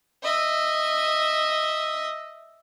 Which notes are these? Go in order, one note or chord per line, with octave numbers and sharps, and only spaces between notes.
D#5 E5